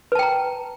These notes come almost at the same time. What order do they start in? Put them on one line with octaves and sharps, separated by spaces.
B4 A5 G5 A#5